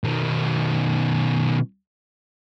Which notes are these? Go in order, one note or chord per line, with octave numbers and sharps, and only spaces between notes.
B2 D#3